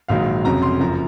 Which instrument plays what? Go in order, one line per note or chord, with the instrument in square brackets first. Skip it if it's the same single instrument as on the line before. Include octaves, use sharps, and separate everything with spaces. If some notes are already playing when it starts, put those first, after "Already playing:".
[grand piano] A#1 G#2 D#3 F#3 F5
F1 F2 C#3 F#3 A#5
C6
F#1 F#2 F3 A#5